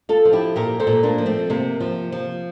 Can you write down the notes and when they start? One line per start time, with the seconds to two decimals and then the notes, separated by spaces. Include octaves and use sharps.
0.09 F4 A4
0.25 F3
0.33 E4 G4
0.56 A#2 G4 A#4
0.80 A4 C5
0.87 A#2
1.03 A#3 D4
1.18 F3
1.26 A3 C4
1.50 C3 A#3
1.80 F3
2.12 F3